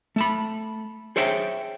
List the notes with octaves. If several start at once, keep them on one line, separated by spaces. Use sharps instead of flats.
A3 A5 B5
G#4 C5 C#5 E5 G5